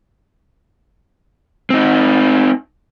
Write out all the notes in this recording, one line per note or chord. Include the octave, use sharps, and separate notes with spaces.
C4 D#4